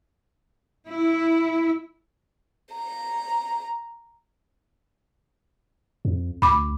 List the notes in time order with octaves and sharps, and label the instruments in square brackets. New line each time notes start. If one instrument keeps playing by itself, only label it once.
[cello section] E4
[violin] A#5
[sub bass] F2
[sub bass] D2 [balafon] B5 D6